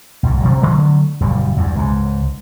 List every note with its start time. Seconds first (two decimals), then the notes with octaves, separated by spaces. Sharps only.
0.23 B1 G#2
0.40 C3 F3 G3
0.61 D3 F#3 A3
1.21 F#1 A#2 G3
1.57 E2 G2
1.75 C#2 G#2